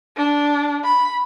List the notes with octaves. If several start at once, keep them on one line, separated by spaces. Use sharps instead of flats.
D4
B5